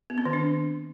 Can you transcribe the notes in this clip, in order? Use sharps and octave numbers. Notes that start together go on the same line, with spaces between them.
B3
C4
D#3
D4